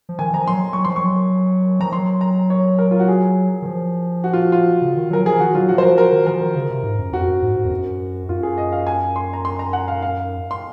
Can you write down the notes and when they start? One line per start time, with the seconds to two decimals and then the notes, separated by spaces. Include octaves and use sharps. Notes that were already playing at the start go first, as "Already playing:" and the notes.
0.09 F3
0.19 D#3 G#5
0.34 F3 A#5
0.47 F#3 C6
0.73 F#3 C#6
0.85 F3 C6
0.96 F#3 C#6
1.80 F3 A#5
1.92 F#3 C6
2.21 A#5
2.50 C#5
2.79 A#4
2.91 F4
2.99 F#4
3.08 G#4
3.62 D#3
3.66 F3
4.24 F#4
4.33 F4
4.52 F4
4.82 C#3
4.97 D#3
5.10 F#3 A#4
5.25 F3 G#4
5.39 D#3 F#4
5.54 F#3 F4
5.68 F3 F#4
5.78 F#3 C5
5.83 F3 A#4
5.98 A#4
6.12 D#3
6.26 F3 A#4
6.41 D#3
6.55 C#3
6.70 C3
6.84 G#2
6.99 F#2
7.12 F2 F#4
7.28 F#2
7.42 G#2
7.56 G#2
7.65 F2
7.71 F#2
8.29 F#2 F4
8.43 G#4
8.58 D#5
8.73 F5
8.87 G#5
9.16 C6
9.33 A#5
9.45 C6
9.59 A#5
9.73 F#5
9.88 F5
10.02 F5
10.51 C6